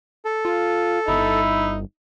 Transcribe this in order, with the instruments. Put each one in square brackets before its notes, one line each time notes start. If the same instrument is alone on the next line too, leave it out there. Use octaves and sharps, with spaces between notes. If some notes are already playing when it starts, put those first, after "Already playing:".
[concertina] A4
[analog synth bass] F4
[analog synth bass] G1 [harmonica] D#4 [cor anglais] E4